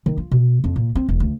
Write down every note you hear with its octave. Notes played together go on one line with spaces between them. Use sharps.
D#3
F4
B2
F2
A#2
C4
E1
D2